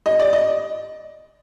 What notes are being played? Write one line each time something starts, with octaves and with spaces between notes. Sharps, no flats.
D#5
D5
D#5